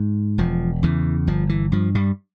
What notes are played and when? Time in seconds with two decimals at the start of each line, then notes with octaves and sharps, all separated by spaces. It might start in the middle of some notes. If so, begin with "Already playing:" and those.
Already playing: G#2
0.38 E1 F3
0.83 E2 C#3 E3
1.27 G1 F3
1.49 E3
1.72 G2 F3
1.95 G2 G3